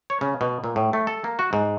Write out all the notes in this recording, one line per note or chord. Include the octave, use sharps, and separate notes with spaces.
C#5
C#3
B2
A#2
A2
A3
A4
A#3
F#4
G#2